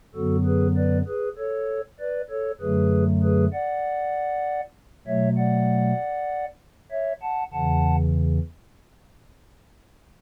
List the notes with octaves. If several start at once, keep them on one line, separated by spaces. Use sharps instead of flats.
F#2 D3 F#3 B3 F#4 A4
G#4 B4
B4 D5
G#4 B4
A4 C#5
B4 D5
A4 C#5
F#2 D3 F#3 A3 G#4 B4
G#4 B4
D5 F#5
B2 F#3 A3 C#5 E5
D5 F#5
C#5 E5
F#5 A5
E2 C#3 E3 F#5 A5